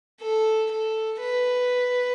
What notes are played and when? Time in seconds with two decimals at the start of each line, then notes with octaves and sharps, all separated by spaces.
0.21 A4
0.71 A4
1.20 B4